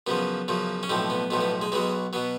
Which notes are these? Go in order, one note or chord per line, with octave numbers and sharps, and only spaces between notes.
F#2 C#3 F3 B3
F#2 C#3 F3
C#4
B1 A2 F3 C4
B3
B1 A2 F3 B3
B3
G#3
B1 B2 F#3 G#3
B2 F#3 B3